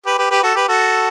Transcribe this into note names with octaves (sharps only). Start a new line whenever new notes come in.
G4 B4
G4 B4
G4 B4
F#4 A4
G4 B4
F#4 A4